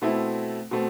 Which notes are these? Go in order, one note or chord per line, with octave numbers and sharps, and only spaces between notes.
B2 A3 C4 E4
B2 A3 C4